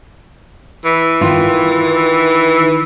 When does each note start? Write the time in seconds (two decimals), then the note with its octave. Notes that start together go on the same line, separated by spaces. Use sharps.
0.85 E3
1.21 D#3 F4